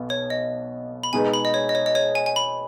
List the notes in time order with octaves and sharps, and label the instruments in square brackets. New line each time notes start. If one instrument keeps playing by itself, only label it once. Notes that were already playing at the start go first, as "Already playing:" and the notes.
Already playing: [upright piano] B1 B2 B3
[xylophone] C#5
D#5
B5
[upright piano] B2 G#3 D#4 G#4 B4 [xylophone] G#5
[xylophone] B5
D#5
C#5
D#5
C#5
D#5
C#5
G#5
G#5
B5